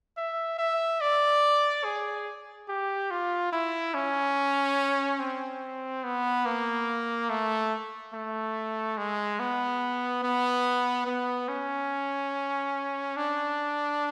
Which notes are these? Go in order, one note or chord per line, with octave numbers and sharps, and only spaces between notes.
E5
E5
D5
G#4
G4
F4
E4
C#4
C4
B3
A#3
A3
A3
G#3
B3
B3
B3
C#4
D4